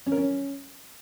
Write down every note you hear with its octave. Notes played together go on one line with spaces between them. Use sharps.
C#4
A#4
C#4